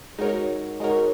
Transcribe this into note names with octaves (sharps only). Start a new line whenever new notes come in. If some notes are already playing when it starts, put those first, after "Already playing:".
G#3 D#4 F#4 A#4 C#5
G#3 D#4 F#4 A#4 C#5